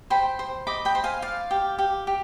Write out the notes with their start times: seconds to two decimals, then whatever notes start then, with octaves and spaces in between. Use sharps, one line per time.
0.10 C5 G5 B5
0.39 C5
0.67 D#5 B5 D6
0.85 G5 B5
0.95 C5
1.04 F5 G#5
1.22 D5 F5
1.51 G4
1.79 G4
2.07 G4